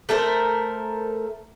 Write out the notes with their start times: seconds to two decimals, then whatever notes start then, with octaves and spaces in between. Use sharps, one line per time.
0.09 A3 A4 A#4 C5